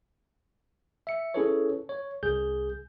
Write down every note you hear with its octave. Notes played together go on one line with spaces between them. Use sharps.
E5 C#7
C#4 E4 G#4 A4 B4 C#5
C#5
C2 G#4 G6